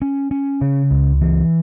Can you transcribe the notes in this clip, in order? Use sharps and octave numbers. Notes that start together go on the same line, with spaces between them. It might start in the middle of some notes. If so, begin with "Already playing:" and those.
C#4
C#4
C#3
C#2
E3